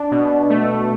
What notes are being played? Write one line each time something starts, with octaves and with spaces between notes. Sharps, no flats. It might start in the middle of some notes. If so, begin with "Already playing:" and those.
Already playing: D4
B2
A3